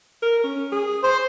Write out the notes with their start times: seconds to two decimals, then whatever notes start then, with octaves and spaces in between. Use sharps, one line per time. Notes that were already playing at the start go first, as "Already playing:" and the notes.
0.22 A#4
0.44 C#4
0.72 G#4
1.03 C5